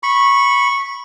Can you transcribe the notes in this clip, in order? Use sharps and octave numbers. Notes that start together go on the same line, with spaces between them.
B5 C#6